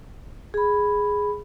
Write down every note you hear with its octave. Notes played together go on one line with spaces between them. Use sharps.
G#4 B5